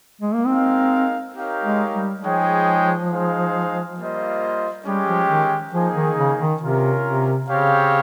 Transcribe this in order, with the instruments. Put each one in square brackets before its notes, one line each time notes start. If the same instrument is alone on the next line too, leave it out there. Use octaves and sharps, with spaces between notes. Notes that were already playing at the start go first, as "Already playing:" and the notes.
[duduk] G#3
A#3
[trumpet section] G#3 D#4 A#4 F5 [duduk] C4
[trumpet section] D#4 G4 A#4 C#5 F5
[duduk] G#3
G3
[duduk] F3 [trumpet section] G#3 D#4 G#4 C#5 G5
[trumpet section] G#3 D#4 G#4 C5 F5
G3 A#3 F4 C5 D#5
[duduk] G3 [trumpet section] G#3 C#4 G4
[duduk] F3
D#3
[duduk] F3 [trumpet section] A#3 D#4 G#4
[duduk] D#3
C#3
D#3
[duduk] C3 [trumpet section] C#4 F4 A#4
[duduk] C3
[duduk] C#3 [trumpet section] C4 G4 C#5 F5